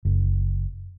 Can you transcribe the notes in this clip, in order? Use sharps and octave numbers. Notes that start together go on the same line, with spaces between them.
F#1